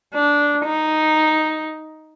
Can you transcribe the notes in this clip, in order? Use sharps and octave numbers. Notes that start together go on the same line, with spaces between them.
D4
D#4